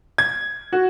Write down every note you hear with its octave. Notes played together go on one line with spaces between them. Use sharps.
G#6
F#4